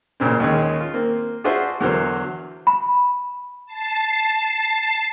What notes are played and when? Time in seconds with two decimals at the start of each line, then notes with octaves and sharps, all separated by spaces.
0.20 A1 A#2 C#3 C4
0.40 D#2 D#3 G#3 C#4
0.81 F4
0.94 A#3 C4
1.44 D4 F4 F#4 G#4 C5 E5
1.81 E2 D3 F#3 A#4 C5
2.67 B5
3.66 A5 C7